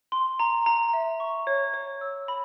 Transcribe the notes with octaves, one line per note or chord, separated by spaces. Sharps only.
C6
A#5
A#5
E5
C#6
C#5
C#5
E6
B5